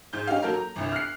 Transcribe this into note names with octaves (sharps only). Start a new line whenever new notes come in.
G#2 G6
C#4 D#4 G4 F5
F#3 A#3 A4 A#4
A#5
G1 C2
F6 F#6 C7